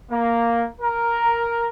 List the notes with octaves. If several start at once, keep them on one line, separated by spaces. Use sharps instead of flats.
A#3
A#4